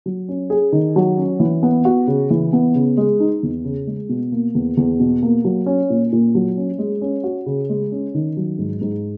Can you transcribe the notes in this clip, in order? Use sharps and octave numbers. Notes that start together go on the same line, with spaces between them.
F#3
C#4
G#4
D#3
F#3
C#4
E3
B3
F#4
C#3
E3
B3
C#3
G#3
D#4
E2
C#3
G#3
B2
A#3
E2
E2
B2
A#3
F#3
C#4
A#2
A#2
F#3
C#4
G#3
C#4
F#4
C#3
G#3
C#4
D#3
F#3
G#2
G#2